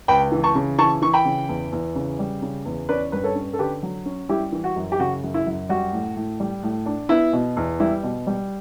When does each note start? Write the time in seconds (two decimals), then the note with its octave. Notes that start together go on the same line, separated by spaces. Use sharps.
0.08 C#2 G5 B5
0.32 E3
0.44 A5 C#6
0.55 C#3
0.78 E3 A5 C#6
1.02 E3 C#6
1.13 G5 B5
1.25 C#3
1.49 E2
1.72 E2
1.95 C#3
2.19 G3
2.42 C#3
2.65 E2
2.89 C#4 B4 D5
3.12 G2 B4
3.24 A4 C#5
3.35 C#4
3.53 A4
3.59 D3 G4 B4
3.83 F#3
4.06 C#4
4.29 G3 E4 G4
4.52 E3
4.64 F#4
4.76 F#2
4.92 G4
4.99 C#3 F#4
5.23 F#2
5.34 E4
5.47 F#2
5.69 G3 F#4
5.92 A2
6.16 A2
6.40 G3
6.63 A2
6.86 D4
7.09 B3 E4
7.33 B2
7.57 E2
7.80 G3 E4
8.03 B2
8.27 G3